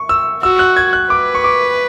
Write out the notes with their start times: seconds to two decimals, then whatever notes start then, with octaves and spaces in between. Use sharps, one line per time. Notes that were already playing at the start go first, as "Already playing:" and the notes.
Already playing: C#6
0.09 E6
0.43 F#4 E6
0.59 F#6
0.76 G#6
0.93 F#6
1.10 B4 D6
1.35 C#6
1.44 D6